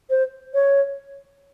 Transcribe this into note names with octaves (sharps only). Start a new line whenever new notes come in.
C5
C#5